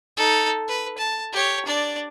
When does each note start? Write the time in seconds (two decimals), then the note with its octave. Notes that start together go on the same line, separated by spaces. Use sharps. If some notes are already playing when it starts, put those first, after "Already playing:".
0.17 D#4 A4
0.68 B4
0.98 A5
1.33 G4 C#5
1.66 D4 D5